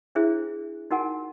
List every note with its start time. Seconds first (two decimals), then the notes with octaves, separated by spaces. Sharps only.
0.15 D4 E4 G#4 C5 E5
0.91 D#4 F#4 A#4 F#5 G#5